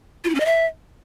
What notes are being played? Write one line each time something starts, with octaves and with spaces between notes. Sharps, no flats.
F4
E4
C#4
D#5
E5